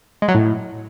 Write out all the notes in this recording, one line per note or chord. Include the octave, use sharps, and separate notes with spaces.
G#3
F#3
A2